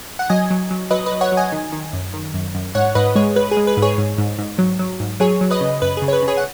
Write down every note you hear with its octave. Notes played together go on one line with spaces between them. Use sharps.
F#5
F#3 D#5 G#5
F#3
F#3
F#3 B4 D#5
B4 D#5
F#3
C#5 F#5
F#3
D#5 G#5
D#3
D#3
F#2
D#3
F#2
F#2
G#2 C#5 F#5
G#2 B4 D#5
G#3 G#4 C#5
G#3 B4
G#4
G#3
B4
G#2
G#4 C#5
G#2
G#2
G#2
F#3
F#3
G#2
F#3 G#4 C#5
F#3
B4 D#5
C#3
F#2 B4
C#3 G#4
C#5
B4
C#3
G#4 C#5
F#5